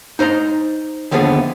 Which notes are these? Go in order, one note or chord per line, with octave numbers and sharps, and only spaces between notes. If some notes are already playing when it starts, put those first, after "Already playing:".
D#4 C5 D#5 A#5
D#2 D3 F3 A3 B3 G#4